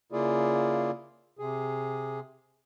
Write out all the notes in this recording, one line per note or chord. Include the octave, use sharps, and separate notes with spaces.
C#3 A#3 E4 F4 G#4 D5
C3 G#4